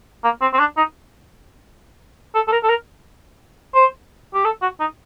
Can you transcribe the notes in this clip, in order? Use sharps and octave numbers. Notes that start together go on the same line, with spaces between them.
A#3
C4
C4
D4
D#4
A4
A4
A#4
A4
A#4
C5
G4
A4
F#4
D#4